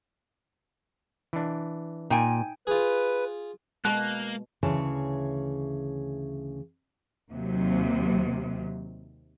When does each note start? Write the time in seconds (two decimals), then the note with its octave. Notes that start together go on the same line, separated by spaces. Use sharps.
1.33 E3 D4
2.10 A#2 D#4 G5 G#5
2.67 F4 G#4 B4
3.85 B2 G#3 A#3 F#6
4.63 D2 C#3 E3 G#4 C#5 A5
7.31 D#2 C3 F#3